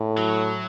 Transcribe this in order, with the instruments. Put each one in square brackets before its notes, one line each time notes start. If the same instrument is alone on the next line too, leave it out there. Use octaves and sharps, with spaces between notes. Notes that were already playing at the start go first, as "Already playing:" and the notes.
Already playing: [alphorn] A2
[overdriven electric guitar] F#3